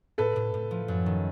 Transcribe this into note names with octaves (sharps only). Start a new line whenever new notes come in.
A2 A4 B4
A2
A2
F3
F#2
D#3